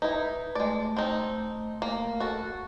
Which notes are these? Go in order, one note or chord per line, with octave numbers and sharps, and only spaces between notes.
D#4 E4 B4
G#3 A3 D5
C4 D#4
A#3
F#4 A4